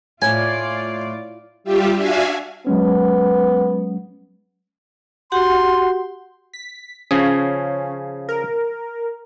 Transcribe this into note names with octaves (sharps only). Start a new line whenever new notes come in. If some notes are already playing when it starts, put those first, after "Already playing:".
A2 F4 D5 G#5
G3 F4 G4 E5
D4 F#4 E5 F5 G#5
F#3 G#3 B3 C#4
F#4 G4 F#5 C6
B6
C#3 F3 C#4 G#4
A#4